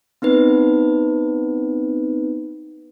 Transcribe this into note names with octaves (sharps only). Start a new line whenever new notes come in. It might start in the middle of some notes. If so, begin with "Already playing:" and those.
B3 C4 D#4 B4